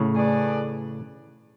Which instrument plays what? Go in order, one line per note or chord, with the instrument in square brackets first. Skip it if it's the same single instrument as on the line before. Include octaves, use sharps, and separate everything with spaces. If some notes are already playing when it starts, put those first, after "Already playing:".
Already playing: [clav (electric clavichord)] A2 C#3
[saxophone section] A3 D4 G#4 B4 D5